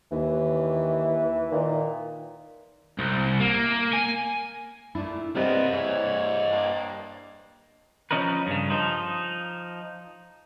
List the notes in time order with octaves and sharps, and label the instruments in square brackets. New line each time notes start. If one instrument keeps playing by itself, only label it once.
[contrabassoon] D#2 [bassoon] E3
[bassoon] A#2 [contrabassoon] D#3
[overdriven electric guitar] C2
A#3
G#5
[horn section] A#2 A3 [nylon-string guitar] D4 E4
[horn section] B3 A#4 [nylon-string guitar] C4 G4 D5 [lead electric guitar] C5 D#5
[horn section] E3 G3 C#5 [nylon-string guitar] E5
[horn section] G2 A#3
[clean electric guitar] F3 A#3 C#4 D#4 A#4 B4
G2 C#3
F3 D#4